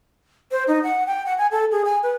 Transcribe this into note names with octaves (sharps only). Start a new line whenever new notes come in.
C5
D#4
F#5
G5
F#5
G#5
A4
G#4
G#5
B4